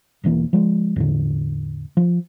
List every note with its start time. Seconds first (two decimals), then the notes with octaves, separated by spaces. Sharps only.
0.24 E1 B1 E3 A#3
0.53 F3 G#3
0.96 E2 A2 D3
1.97 F3